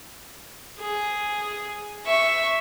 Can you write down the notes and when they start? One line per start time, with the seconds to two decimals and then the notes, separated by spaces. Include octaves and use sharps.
0.79 G#4
2.06 E5 C#6